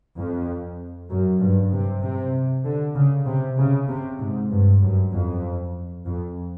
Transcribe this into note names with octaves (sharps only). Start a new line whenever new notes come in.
F2
F#2
G2
C3
C3
D3
C#3
C3
C#3
C3
G#2
G2
F#2
F2
F2